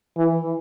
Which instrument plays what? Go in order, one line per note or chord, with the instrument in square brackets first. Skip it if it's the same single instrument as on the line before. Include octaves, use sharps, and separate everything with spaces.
[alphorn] E3